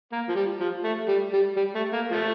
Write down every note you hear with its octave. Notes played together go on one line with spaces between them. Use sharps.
A#3
F3
G3
F3
A3
G3
G3
G3
A3
A#3
F3 A3